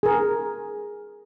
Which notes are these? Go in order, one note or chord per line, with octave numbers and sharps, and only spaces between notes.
G#4 A#4